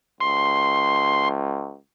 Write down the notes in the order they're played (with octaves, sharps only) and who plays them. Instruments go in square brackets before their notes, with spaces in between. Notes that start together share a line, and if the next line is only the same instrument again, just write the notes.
[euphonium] C#2 [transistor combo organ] C6